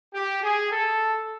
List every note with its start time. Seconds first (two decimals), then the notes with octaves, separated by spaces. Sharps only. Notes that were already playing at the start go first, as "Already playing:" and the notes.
0.14 G4
0.43 G#4
0.70 A4